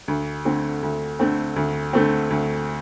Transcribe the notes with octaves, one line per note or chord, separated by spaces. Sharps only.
D2
D3 A3 C4
D2
D3 A3 C4
D2
D3 A3 C4
D2